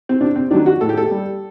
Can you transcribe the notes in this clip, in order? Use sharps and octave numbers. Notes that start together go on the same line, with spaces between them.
C4
C3 D4
C4
D#3 F#3 D4
F#4
A2 A4
G4
A4
G3